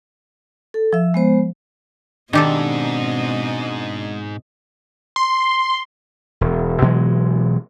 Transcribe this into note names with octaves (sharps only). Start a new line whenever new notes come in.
A4
F3 E5 E6
G#3 B3 C5
G#2 B2 D#3 C4 D4 G4 A4 D#5
C6
E1
B2 E3 F#3 G#3